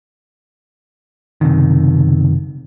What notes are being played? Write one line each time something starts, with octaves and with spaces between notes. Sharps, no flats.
F#1 C3 D#3